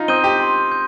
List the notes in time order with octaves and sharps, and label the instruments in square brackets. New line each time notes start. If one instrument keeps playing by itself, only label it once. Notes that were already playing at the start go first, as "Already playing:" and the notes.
Already playing: [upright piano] D#4 F4
[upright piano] C4 [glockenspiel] D#6 G6 D#7 G7
[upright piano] G4
[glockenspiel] C6
G6